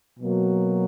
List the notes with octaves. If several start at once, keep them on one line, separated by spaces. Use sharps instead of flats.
B2 F#3 A#3